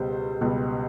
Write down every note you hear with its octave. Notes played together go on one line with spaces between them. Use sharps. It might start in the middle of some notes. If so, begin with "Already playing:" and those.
Already playing: C#2 B2 G3 B3 C5
C#2 B2 G3 B3